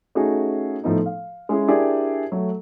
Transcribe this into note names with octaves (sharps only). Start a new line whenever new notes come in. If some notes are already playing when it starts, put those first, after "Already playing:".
A3 C#4 D#4 F#4 G#4
A2 F3 A3 B3 D#4
F5
G#3 C#4 E4 G#4
D4 E4 G4 G#4 A#4 D5
F#3 A3